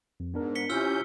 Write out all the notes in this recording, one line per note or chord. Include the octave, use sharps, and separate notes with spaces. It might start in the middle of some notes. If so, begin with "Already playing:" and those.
F2
G#2 B3 D4 A#4
B6 C#7 G7
C3 C#4 E4 F4 E6 F6 G6 G7